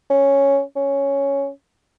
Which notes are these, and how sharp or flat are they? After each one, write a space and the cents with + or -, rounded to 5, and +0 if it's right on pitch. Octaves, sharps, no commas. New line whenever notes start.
C#4 +0
C#4 +0